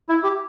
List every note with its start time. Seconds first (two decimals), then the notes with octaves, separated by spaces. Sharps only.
0.09 E4
0.24 G4